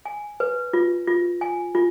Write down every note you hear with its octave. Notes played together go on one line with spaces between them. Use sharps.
G#5
B4
F4
F4
G#5
F4